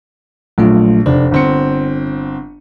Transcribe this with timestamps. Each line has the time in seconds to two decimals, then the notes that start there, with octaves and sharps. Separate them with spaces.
0.58 A#1 F#3 A3 F4
1.06 F1 D4 C5
1.32 G1 C4 C#7